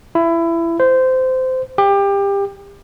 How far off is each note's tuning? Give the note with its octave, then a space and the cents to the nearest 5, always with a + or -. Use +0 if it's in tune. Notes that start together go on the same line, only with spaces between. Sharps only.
E4 +20
C5 -20
G4 +25